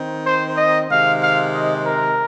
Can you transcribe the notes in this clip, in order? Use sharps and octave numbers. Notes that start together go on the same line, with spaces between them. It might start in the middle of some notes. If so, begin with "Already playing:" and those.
Already playing: D#3 C4
C5
D#5
C3 D#3 G#3 C4 F5
F5
D#5
A#4